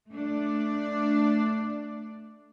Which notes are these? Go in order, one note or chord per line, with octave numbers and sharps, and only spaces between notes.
A3 D4 D5